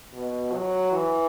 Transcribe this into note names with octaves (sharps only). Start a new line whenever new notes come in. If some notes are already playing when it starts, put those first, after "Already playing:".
B2
F#3
E3